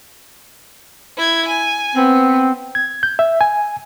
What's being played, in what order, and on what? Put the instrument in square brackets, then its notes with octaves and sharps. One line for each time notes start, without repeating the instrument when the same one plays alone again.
[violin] E4 G#6
G#5
[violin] B3 [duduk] C4
[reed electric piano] G#6
G6
E5
G#5